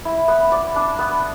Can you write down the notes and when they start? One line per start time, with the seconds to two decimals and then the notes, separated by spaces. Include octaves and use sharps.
0.05 E4
0.28 B3
0.52 D5
0.76 D4
0.99 B3